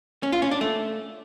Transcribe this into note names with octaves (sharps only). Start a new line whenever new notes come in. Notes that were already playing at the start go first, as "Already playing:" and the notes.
C#4
F4
C#4
D4
A3